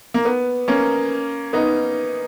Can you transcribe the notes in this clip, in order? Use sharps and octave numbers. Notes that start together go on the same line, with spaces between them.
A#3
B3
A#3 C#4
B3 D#4